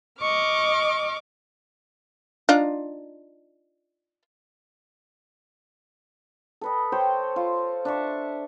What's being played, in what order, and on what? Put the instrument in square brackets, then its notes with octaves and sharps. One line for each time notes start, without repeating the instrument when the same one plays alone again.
[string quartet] D#5 C#6 D6 F6
[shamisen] D4 D#4 F4
[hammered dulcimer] A4 B4 D#5
C5 C#5 G5
F4
D4 E5 C#6